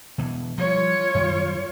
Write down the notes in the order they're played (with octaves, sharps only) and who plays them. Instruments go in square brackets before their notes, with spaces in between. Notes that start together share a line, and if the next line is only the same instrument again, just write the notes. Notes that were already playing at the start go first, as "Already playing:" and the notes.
[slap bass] B2 E3
[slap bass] F3 G3 [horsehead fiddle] F4 C#5
[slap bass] F#2 D#3 G3